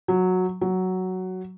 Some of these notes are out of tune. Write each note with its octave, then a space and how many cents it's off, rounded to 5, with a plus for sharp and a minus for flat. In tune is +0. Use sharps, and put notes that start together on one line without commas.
F#3 -10
F#3 +5